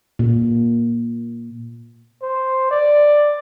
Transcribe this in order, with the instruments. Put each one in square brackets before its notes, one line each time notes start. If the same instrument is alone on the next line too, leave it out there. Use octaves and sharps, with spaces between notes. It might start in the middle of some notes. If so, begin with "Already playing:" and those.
[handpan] A#2
[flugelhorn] C5
D5